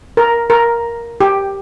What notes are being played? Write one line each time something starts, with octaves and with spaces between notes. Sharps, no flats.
A#4
A#4
G4